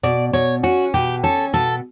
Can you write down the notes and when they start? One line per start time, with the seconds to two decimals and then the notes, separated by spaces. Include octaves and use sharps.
0.03 B2 D5
0.33 B2 C#5
0.63 C#4 F#4
0.94 B2 G4
1.23 C#4 A4
1.53 B2 A4